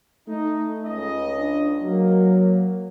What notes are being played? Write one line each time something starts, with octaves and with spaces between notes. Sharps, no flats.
A3 D#4
C#2 D#5
D4
F#3 A#3